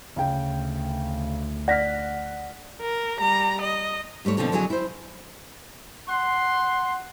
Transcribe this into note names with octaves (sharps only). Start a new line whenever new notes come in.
D2 C#3 G5
D5 F#5 F6 A#6 B6
A#4
G3 A#5
D#5
G#2 G3 A3 C#5
B2 D3 F3 C4 A4 C#5
F2 D3 F#3 E4 G#4 G#5
E4 C5
F#5 C6